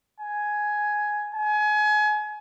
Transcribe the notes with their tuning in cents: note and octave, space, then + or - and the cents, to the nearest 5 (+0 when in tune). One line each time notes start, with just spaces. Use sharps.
G#5 +10
G#5 +30